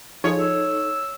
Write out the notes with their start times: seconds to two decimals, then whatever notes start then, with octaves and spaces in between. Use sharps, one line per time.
0.24 F3 D#4 F4 G#4 A4 C#5
0.40 E6